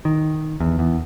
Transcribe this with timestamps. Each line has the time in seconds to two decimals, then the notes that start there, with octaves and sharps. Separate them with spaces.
0.05 D#3
0.60 E2
0.79 E2